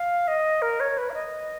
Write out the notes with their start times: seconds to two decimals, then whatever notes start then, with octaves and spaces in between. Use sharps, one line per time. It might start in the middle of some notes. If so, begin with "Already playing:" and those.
Already playing: F5
0.28 D#5
0.62 A#4
0.80 C#5
0.98 B4
1.10 F5
1.14 D#5